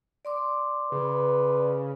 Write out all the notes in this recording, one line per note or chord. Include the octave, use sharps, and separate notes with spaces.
D5 C6 D6
C#3 B4